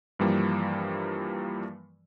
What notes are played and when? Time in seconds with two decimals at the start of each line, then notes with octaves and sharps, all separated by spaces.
0.19 G2 E3 F3 G3 A#3